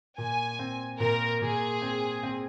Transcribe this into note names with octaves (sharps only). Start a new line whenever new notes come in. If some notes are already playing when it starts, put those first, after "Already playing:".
A#2 G#5
C4
A#2 A#4
A#2 G#4
C4
C4